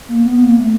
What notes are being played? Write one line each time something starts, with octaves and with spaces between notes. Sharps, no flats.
A#3
B3
A#3
A3